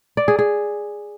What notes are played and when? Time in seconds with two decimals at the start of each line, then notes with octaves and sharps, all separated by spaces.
0.17 D5
0.28 G#4
0.39 G#4